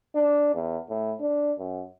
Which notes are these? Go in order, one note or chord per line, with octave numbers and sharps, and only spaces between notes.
D4
E2
A2
D4
F#2